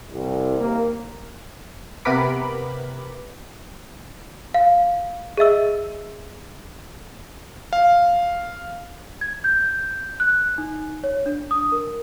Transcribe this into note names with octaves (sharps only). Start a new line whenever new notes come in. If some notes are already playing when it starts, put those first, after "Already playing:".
C2
D#2 A#3
C3 B3 A#4 B4 B5 D6
F5
G#4 D#5 E5 E6
F5
G#6
G6
F#6
D#4
C#5
D4
D#6
A#4